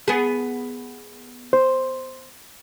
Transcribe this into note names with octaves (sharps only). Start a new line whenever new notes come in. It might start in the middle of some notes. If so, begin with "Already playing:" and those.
B3 G#4
C5